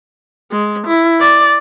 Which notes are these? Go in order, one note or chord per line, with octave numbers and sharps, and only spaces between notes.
G#3
E4
D5